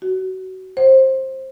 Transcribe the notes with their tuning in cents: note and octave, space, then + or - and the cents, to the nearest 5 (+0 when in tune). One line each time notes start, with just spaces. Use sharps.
F#4 +25
C5 +20